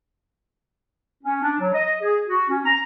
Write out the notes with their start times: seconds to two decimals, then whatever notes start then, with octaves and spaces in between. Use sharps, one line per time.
1.24 C#4
1.42 D4
1.60 F#3
1.74 D#5
2.00 G#4
2.28 F#4
2.49 C#4
2.65 A#5